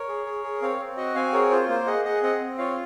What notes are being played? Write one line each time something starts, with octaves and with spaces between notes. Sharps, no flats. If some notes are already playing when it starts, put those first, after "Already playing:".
Already playing: A#4 C#5
G#4
G#4
G#4
C4 C#5 F5
C4
F#4 D#5 F#5
C4 F5 G#5
G#4 A#4 C#5
F4 C5
A#3 C5
G#4 D#5 F#5
G#4 D#5 F#5
C4 D#5 F#5
C4
F4 C#5 F5